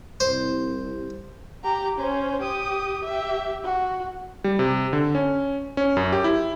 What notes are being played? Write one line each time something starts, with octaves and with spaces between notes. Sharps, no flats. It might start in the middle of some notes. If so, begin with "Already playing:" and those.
C2 C5
G4 A#5
C#4 C5
G4 D#6
G4 E5
F#4
G3
C3
D3
C#4
C#4
F#2
G4
E4